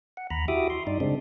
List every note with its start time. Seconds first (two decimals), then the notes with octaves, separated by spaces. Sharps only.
0.17 F#5
0.30 D#2 A#5 B5
0.48 E4 F#4 G4 E5 D6 D#6
0.70 C6
0.87 G2 D#4 D5
1.00 C#3 G#3 C4 D4